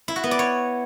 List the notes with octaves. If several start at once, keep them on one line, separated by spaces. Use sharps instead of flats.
E4
F#4
B3
D5
C#5